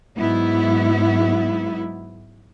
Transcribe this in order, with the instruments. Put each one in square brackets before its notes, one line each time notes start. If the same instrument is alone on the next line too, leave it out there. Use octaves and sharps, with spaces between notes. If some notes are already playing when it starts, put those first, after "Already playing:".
[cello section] G#2 F#3 B3 E4